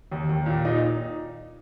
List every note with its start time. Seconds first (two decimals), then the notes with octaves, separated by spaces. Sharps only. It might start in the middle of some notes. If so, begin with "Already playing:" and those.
0.11 D#2
0.29 D#2
0.46 A#2
0.65 D#4